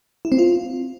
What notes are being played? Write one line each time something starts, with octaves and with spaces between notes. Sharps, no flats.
E4
C4
F4